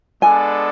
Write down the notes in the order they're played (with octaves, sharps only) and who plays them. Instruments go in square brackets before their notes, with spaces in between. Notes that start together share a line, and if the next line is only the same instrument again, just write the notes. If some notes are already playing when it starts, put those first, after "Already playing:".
[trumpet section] G#3 B3 D4 A4 D5 [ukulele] G#5